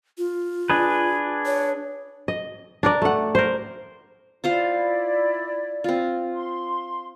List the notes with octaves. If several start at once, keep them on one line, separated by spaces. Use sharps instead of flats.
F4
D4 G#4 B4
C#5
D#5
D4 A#4 D5
A3 F#5
A#4 C5
E4 F4 C5 D5 F5
C4 F4
C6